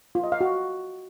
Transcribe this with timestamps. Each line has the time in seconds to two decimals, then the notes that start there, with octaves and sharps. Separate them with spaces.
0.15 F4
0.24 D#5
0.32 F5
0.41 F#4